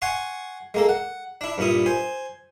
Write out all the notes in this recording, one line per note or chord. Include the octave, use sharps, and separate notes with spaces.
F#5 G#5 C6 C#6
G#3 A#3 A4
F#5
D4 E4
G2 A#2 E4 D#6
C5 G#5